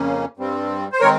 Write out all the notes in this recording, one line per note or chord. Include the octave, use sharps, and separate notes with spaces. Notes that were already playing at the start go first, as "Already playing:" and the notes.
Already playing: F2 C#3 A#3 C#4
G2 G3 C4
C5
D#3 G#3 C4 A#4 C#5